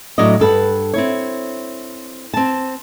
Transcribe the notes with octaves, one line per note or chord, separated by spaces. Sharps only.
A2 F#3 D4 D5 D#5
G2 A4 B4 F#5
C4 E4 C#5
C4 A5